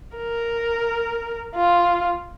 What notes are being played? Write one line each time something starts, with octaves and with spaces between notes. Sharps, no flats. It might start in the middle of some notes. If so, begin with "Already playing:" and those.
A#4
F4